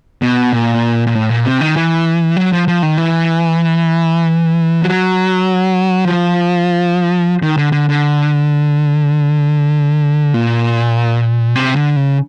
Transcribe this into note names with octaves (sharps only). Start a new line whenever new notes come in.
B2
A#2
A#2
A2
A#2
C3
D#3
E3
F#3
F3
F3
D#3
E3
F#3
F3
D#3
D3
D3
D3
A#2
C3
D3
C#3